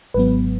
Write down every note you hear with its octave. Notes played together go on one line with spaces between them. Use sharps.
G#1 G#2 F#3 B3 B4